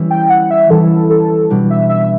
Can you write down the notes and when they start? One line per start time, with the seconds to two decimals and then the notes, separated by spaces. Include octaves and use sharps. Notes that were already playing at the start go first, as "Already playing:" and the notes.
Already playing: E3 G3 C#4 E4
0.11 G5
0.30 F#5
0.51 E5
0.70 E3 G3 C#4 E4 A4
1.10 A4
1.50 B2 G3 D4
1.70 E5
1.89 E5